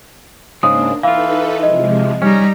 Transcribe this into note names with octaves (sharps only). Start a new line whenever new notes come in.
G#2 C#3 G#3 A#3 D4 D#6
E3 D#4 F4 A4 B4 F5
C3 F3 G#3 D#5
G3 C#4 D#4 A#5